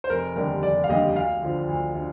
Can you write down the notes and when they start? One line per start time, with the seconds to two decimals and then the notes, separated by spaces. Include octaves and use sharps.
0.04 C5
0.10 F1 A#4
0.36 D#2 D3 G3 D4 A#4
0.63 F1 D5
0.84 F5
0.89 D#2 D3 G3 D4 D#5
1.16 D2 F5
1.42 D3 F3
1.69 D2
1.95 D3